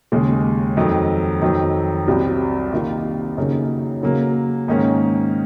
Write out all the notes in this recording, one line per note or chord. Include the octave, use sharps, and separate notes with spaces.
D#2 C#3 G#3
F2 D#3 F#3
F2 D#3 F#3
C2 C3 F#3
C3 D#3 A#3 F4
F#2 C#3 F#3 A#3 D#4
C#3 F#3 A#3
G#2 D#3 A#3 C#4